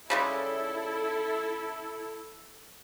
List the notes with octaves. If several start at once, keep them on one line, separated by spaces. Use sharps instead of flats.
C#3 G3 G#3 E4 A4